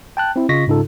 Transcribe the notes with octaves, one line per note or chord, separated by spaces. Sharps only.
G5 A5 F#6
C4 E4
C#3 F4 D#5 C#6 A#6 B6
G#2 C#3 D#4 F4 A4